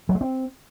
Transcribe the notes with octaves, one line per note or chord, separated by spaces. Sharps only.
F#3
G#3
C4